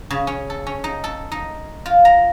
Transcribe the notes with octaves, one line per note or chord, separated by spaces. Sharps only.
C#3
C#4
A4
C#4
D#4
A4
D#4
F4
A#5